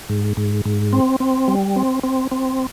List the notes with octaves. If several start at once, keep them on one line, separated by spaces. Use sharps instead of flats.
G#2
G#2
G#2
C4
C4
G3
C4
C4
C4